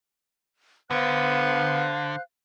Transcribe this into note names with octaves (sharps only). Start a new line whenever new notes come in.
D3 B3 C5 F5 F#6